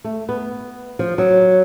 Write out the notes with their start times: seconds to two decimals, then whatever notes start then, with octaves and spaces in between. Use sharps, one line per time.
0.04 A3
0.29 B3
0.99 F3
1.18 F#3